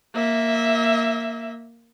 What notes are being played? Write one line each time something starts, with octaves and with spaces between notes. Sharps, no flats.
A#3 E5